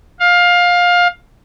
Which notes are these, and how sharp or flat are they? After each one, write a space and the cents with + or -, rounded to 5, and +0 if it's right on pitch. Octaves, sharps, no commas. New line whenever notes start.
F5 +20